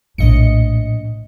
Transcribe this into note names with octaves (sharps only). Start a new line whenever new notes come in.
A#1 A2 D#5 C#7